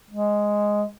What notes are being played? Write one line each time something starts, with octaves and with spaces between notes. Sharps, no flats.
G#3